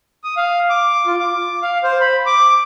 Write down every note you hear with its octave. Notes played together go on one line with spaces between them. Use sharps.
D#6
F5
D6
F4
D6
F5
C5
B5
D6